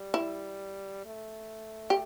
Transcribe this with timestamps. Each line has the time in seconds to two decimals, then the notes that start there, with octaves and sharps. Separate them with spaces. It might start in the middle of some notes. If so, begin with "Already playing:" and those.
Already playing: G3
0.14 E4
1.05 A3
1.90 G4